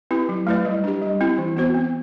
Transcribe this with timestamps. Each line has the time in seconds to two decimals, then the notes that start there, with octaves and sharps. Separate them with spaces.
0.11 C4 E4 G4 B4
0.29 F#3
0.47 A3 E4 B4 D5
0.65 G3
0.84 D4 G4
1.02 G3
1.21 C4 E4
1.38 E3
1.57 B3 F#4 C5
1.75 C4